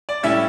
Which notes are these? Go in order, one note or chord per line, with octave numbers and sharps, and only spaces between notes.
D5
A2 G3 C#4 E4 E5